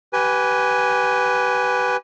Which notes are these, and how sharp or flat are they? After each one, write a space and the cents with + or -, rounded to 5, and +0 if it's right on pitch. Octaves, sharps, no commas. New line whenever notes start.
G4 -25 B4 +0 G#5 +0